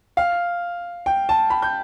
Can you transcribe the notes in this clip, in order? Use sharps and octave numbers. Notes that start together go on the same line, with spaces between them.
F5
G5
A5
B5
G6